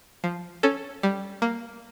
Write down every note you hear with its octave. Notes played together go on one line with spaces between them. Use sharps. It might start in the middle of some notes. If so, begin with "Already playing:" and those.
F3
C#4 A4
G3
A#3